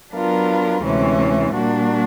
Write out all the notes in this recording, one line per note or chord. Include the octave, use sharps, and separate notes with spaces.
F#3 B3 D4 F4 A#4
D2 C3 E3 G#3 C#4
A#2 G3 A#3 D4 F#4